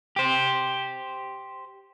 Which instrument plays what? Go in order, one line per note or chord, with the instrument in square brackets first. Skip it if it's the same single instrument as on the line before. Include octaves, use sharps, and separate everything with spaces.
[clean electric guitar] G4 C5